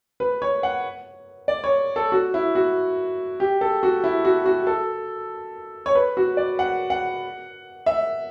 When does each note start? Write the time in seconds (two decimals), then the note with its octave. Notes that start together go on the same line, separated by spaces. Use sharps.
0.20 B4
0.42 C#5
0.63 F#5
1.48 D5
1.64 C#5
1.96 A4
2.12 F#4
2.34 E4
2.55 F#4
3.40 G4
3.61 A4
3.83 F#4
4.04 E4
4.25 F#4
4.46 F#4
4.67 A4
5.86 C#5
5.95 B4
6.17 F#4
6.37 D5
6.59 F#5
6.90 F#5
7.86 E5